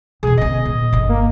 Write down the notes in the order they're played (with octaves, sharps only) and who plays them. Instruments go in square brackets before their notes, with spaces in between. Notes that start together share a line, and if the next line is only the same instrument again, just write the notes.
[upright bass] E2 B2 [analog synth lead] G#4
[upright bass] D3 B3 [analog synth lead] D#5
[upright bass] A#2
G1 D3
[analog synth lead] A#3